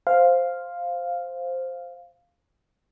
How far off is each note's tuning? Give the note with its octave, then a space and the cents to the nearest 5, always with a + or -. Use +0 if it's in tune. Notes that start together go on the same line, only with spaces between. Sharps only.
C5 +0 F5 +0